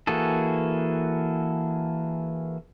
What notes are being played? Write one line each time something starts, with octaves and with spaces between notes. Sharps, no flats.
E3 A#3 F#4 G#4 A4